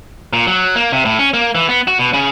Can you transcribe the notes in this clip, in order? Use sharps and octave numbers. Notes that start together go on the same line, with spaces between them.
A#2
F#3
A#3
C3
A2
C#4
A#3
E3
B3
F#4
B2
C#3